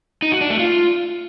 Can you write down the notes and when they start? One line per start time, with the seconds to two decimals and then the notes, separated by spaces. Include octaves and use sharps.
0.22 D#4
0.32 F#4
0.41 D4
0.50 A3
0.59 F4